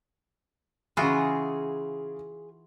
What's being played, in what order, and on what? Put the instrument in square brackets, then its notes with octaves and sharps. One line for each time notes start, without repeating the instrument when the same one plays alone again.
[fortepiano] C#3 G#5 [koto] E3 F4 F#4 [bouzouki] G#4